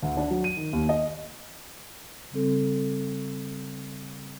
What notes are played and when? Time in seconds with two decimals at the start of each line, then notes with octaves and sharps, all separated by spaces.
0.03 D2
0.17 D4
0.31 F#3
0.44 D#7
0.57 D#3
0.73 D#2
0.89 D#5
2.32 C#3 G3 C4 A4